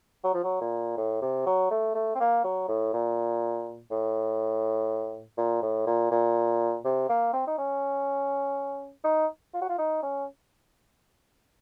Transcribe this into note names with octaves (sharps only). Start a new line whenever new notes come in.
F#3
F3
F#3
A#2
A2
C3
F#3
A3
A3
C4
A#3
F#3
A2
A#2
A2
A#2
A2
A#2
A#2
C3
A#3
C4
D#4
C#4
D#4
F4
F#4
F4
D#4
C#4